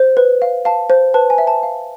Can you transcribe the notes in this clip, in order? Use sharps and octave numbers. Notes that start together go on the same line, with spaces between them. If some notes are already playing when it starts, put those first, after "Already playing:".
Already playing: C5
B4
F5
F5 A5
C5
B4 A5
G#5
E5
A5
F5